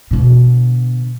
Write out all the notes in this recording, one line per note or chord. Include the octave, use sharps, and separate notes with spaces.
B2 D3